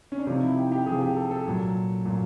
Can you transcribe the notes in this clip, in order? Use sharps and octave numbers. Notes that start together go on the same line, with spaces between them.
C#4
D4
C3 F3 D#4
E4
G4
G4
C3 F3 G#4
G4
A4
A4
A#2 F#3
A#2 F#3